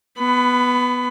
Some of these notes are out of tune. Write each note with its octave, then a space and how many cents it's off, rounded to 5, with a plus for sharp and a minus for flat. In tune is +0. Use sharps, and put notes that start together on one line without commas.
B3 +0 B5 +25